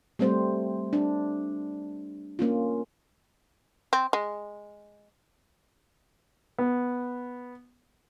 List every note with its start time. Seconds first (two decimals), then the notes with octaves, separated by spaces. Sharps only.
0.19 G3 A3 C4 C5
0.93 D4
2.39 A#3 C#4 F4
3.93 C4
4.13 G#3
6.58 B3